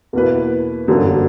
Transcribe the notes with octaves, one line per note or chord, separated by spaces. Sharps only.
E2 B2 A#3 E4 B4
G1 F#2 D3 F#3 A#3